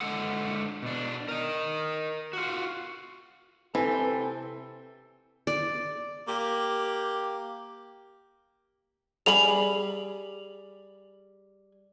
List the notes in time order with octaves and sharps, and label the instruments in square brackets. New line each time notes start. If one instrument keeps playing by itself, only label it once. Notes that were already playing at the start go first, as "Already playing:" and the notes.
[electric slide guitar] D3 G#3 A4 F#5
B2 D4
A#4 D#5
F4 F#4
[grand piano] C3 G#5 [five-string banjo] E3 [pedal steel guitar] C4 G5 [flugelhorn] A4
[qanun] D5
[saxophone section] A#3 G4
[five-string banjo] G3 G#4 B5 [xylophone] F7 F#7